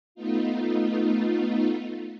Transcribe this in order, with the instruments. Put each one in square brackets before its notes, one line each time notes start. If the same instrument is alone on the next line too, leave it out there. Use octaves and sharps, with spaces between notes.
[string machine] A3 B3 D#4 F4